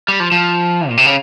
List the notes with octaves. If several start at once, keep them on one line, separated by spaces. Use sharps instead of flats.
G3
F3
F3
A#2
C3
C#3